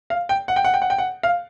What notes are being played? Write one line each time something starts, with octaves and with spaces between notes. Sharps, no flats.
F5
G5
F#5
G5
F#5
G5
F#5
G5
F#5
F5